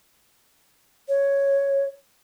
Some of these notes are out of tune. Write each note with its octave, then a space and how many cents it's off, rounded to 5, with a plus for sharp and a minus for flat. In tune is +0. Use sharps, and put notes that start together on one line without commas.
C#5 +0